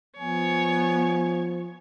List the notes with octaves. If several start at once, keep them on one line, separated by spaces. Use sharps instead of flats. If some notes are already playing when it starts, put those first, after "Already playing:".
F3 B3 C#5 G#5